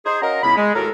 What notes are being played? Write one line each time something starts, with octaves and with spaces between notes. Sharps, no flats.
D#4 G#4 C5
C#4 F#4 A#4 D#5 F5 A#5
C#2 C#3 B3 E4 B5
G#3
D#2 A2 F#4 A4 A#4